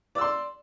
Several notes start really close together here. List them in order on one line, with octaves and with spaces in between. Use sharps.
D5 E6 C6